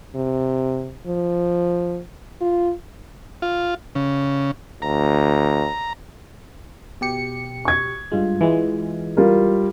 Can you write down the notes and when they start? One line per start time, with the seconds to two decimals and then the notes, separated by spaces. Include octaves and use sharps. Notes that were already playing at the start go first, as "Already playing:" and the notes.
0.15 C3
1.06 F3
2.41 F4
3.42 F4
3.95 C#3
4.82 D2 A#5
7.01 B2 G4 C#7
7.65 C#6 G#6
8.12 G2 G#3 F4
8.41 E3 G#3
9.17 G3 F4 A#4